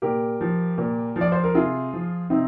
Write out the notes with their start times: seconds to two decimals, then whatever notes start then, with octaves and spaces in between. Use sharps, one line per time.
0.02 A#2 G4 A#4
0.41 F3
0.78 A#2
1.16 F3
1.21 D5
1.32 C5
1.44 A#4
1.55 C3 F4 G#4
1.93 F3
2.30 C3 C4 D#4